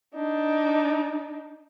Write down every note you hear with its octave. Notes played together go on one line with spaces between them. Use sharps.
D4 D#4